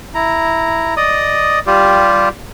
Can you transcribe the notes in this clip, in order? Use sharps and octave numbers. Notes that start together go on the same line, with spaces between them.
E4 A#5
D5 D#5 D#6
G3 F4 G4